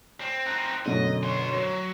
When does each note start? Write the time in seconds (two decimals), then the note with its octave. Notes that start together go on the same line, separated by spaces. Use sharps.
0.21 C4
0.46 C4 D#4 F#6
0.86 F#2 B2 D3 D#5
1.24 C#5 C6
1.53 F#3 C#5